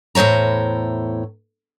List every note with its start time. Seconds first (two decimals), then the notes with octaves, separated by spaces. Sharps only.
0.15 E2 A2 C5 C#5 A#5